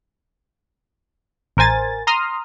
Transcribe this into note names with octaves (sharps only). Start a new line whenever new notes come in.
A1 A#4 C5 G#5 A6
A#5 C6 D#6 F6